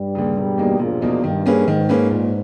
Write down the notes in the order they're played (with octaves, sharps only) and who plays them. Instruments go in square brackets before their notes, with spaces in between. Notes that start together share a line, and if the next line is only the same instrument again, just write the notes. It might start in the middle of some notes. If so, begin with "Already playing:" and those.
Already playing: [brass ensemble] G2 G3
[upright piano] D#2 C#3
E1
E2 B2 A#3 D#4
[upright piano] E1 [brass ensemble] A#1 A#2
[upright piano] E2 B2 A#3 D#4
[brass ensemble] G2 [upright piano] D#3
[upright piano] A#3 C#4 G#4 B4
[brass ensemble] G#2 [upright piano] D#3
[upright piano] A#3 C#4 G#4 B4
A#2